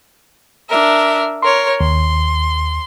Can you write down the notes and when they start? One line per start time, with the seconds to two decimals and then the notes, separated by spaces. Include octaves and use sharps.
0.69 D4 A#4 E5
1.42 A#4 C#5 C6
1.81 D#2 C6